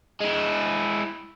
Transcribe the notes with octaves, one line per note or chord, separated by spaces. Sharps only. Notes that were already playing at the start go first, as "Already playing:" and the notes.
G#3 E4